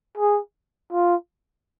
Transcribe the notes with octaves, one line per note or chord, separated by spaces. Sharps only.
G#4
F4